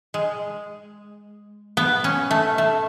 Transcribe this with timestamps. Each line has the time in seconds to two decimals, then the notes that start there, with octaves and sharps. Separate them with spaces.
0.14 G#3
1.77 B3
2.04 C#4
2.31 A3
2.58 A3